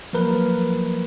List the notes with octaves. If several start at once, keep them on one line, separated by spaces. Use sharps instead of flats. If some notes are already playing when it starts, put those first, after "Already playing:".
F3 F#3 A#3 A#4 B4